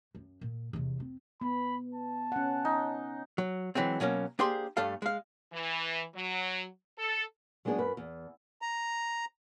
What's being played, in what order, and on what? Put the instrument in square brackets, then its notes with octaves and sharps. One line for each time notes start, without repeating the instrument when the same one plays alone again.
[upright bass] F#2
A#2
E2 C3
C4
[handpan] B3 [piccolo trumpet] B5
[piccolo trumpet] A5
[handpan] C#4 F#5
[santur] D#4
[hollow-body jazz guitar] F#3
E3 F#3 G#3 C4
B2 F#3 A#3 C#4
A#3 D4 G4 G#4 C5 C6
G2 A3 A4 F5
G#3 F5
[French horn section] E3
F#3
A4
[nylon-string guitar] F#3 G#3 B3 D4 G#4
F#2 B4
E2
[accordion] A#5